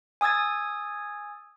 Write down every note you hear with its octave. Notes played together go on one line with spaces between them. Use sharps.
G#5 D#6 E6 G#6 A6